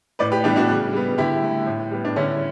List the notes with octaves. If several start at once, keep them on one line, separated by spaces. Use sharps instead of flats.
A2 B4 D5
G4 B4
E3 G3 B3 D4
D4 F#4
C#3
G3 B3
D3 E4 G4
A3
A2
G3 B3
D4
D3 C#4 E4